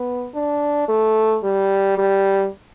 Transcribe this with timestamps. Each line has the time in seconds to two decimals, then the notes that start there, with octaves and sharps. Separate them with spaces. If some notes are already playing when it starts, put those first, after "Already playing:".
Already playing: B3
0.34 D4
0.88 A3
1.44 G3
1.98 G3